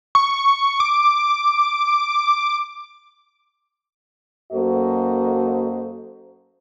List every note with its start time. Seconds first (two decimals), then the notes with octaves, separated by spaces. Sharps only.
0.15 C#6
0.80 D6
4.52 F#2 A#3 F#4 A4 C5 D#5